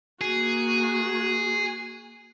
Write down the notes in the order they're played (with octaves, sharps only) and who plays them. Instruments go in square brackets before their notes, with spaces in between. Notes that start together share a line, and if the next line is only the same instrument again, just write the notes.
[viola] A#3 F#4 [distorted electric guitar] G#4